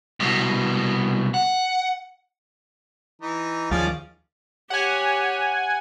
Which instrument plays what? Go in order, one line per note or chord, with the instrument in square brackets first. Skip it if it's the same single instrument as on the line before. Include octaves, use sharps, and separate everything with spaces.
[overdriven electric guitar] C2 B2
F#5
[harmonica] E3 D#4
[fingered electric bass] D#2 [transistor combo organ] F3 [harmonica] C#4 G#4 D5
[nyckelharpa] G4 C#5 [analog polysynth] F#5 G#5